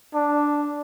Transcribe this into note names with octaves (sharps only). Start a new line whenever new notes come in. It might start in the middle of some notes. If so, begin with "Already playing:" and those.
D4